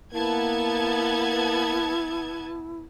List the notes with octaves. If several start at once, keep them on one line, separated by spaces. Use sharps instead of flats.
A#3 B3 E4 A5 G#6